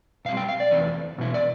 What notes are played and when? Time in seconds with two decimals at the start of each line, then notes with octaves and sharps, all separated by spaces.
0.25 B2 G3 C4 F5
0.37 G5
0.49 F5
0.60 D5
0.71 E2 C3 E3 A3 C4
1.18 E2 B2 E4
1.34 D5